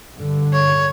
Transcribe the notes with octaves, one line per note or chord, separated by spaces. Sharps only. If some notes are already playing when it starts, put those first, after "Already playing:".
G2 D3
C#5